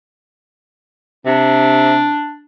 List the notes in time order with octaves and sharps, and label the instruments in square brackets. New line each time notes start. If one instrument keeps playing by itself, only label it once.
[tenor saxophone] C3 [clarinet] D4